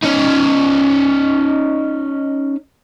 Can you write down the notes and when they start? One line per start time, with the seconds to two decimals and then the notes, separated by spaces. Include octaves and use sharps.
0.03 C#4 D#4